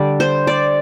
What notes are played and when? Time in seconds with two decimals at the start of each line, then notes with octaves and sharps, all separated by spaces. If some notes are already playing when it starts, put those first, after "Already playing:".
Already playing: D3 G3 D5
0.20 C5
0.47 D5